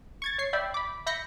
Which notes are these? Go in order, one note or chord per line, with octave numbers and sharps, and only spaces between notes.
C#6 G#6 A6
C#5 C#6 C7
D5 E5 G5 B5
B5 D6
E5 B5 G6 A#6 B6 C#7